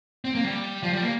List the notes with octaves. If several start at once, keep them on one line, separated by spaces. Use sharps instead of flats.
C4
A#3
G3
F3
G3
A#3